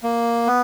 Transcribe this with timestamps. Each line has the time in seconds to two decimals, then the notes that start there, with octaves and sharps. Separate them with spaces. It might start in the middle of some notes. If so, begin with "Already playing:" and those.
0.03 A#3
0.47 B3